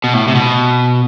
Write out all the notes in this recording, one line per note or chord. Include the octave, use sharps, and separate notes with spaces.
B2
A2
C3
B2